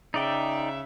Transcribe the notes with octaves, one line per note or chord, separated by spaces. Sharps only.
C#3 D#4 D5 E5 G5